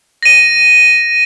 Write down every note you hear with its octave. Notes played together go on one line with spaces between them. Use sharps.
A#6 D#7